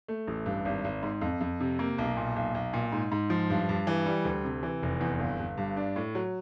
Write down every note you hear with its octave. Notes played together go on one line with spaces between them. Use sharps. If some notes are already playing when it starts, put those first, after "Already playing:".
A3
A1
G2
G#1
G#1
G#2
F2
F2
C3
A#3
B1
A#2
B1
B1
A#2
G#2
G#2
F3
G2
G2
E3
G3
D2
C3
E3
F1
E2
G1
G1
G2
D4
A2
F#3